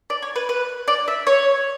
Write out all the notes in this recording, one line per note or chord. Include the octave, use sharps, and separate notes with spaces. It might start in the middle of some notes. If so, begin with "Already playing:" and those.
D5
C#5
B4
B4
D5
E5
C#5